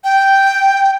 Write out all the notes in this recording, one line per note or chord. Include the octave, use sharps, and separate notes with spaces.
G5